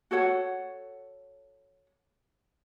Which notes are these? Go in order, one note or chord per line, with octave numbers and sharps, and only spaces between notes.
F#4 A4 C#5 F#5